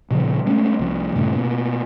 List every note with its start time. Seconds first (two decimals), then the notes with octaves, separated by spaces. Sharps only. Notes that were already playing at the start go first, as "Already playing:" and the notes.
0.11 A#2 C#3 F3
0.46 G#3 A3 C#4
0.79 C2 F3
1.16 G2 A#2 C#3 A3
1.36 B2 A#3